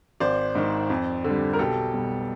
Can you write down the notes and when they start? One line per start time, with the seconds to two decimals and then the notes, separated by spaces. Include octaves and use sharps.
0.20 G#1 C5 D5
0.55 G#2 D#3
0.90 F2
1.24 D3 G3
1.53 A#4
1.59 B1 G4 A4
1.94 B2 G3